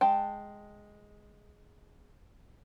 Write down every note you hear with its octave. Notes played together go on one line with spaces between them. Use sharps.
G#3 G5 A5